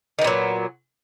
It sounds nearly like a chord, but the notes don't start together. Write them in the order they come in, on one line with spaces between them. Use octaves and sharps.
D#3 B3 A#2 F#3